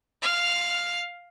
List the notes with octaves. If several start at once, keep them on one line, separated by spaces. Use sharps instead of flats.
F5 F6